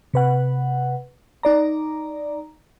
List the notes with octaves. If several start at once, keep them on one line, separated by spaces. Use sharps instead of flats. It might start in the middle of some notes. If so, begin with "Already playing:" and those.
C3 B4 F#5
D#4 D5 A#5